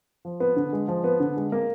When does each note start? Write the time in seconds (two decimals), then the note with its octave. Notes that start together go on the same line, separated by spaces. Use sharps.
0.25 F3
0.40 B3
0.56 D3
0.73 G#3
0.88 F3
1.04 B3
1.20 D3
1.37 G#3
1.52 A#3